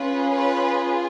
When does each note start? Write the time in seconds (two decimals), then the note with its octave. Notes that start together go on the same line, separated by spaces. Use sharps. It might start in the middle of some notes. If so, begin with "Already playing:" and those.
Already playing: C#4 F4 G#4 B4
0.31 B4